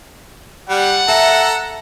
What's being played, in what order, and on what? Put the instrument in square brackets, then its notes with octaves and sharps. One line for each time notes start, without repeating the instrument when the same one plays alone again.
[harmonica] G3 [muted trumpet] F#5
[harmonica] A4 A#5 [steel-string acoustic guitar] E5